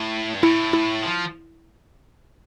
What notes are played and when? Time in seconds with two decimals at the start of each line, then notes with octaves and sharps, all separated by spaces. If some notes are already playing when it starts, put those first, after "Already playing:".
Already playing: A2
0.34 G2
0.42 A2 E4
0.73 E4
1.03 F3